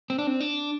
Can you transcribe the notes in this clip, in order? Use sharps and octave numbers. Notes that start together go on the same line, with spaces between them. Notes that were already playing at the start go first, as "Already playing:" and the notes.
C4
D4
C4
D4